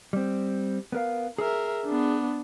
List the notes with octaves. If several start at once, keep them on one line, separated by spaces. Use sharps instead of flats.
G3 C4
B3 A#4 F5
G#4 A#4 E5
B3 D4